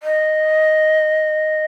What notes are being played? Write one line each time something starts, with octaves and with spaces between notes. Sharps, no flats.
D#5